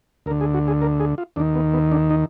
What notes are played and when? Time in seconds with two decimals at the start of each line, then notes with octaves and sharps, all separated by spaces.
0.26 D2 A#4
0.31 D3
0.41 G#4
0.54 F#4
0.68 G#4
0.81 A#4
1.00 G#4
1.18 F4
1.36 D#2 D4
1.40 D#3
1.55 B3
1.74 B3
1.92 D4
2.10 D#4